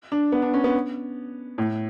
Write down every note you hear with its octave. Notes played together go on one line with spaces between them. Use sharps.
D4
B3
D4
C#4
B3
A2